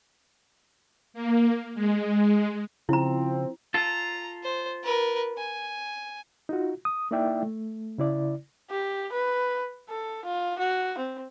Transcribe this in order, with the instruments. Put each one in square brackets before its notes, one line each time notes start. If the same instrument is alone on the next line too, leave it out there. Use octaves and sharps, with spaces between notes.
[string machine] A#3
G#3
[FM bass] C#3 [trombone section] F3 C4 [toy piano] E4 A#5
[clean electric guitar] F4 A4 [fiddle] A#5
[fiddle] C5
A#4 B4
G#5
[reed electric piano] D#4 F4 F#4
D#6
A#3 D#4 E4 D5 E5 G5
A3
C#3 E4 D5
[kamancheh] G4
B4
A4
F4
F#4
C4